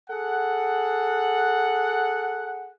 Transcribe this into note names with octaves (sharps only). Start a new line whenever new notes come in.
G#4 A4 F#5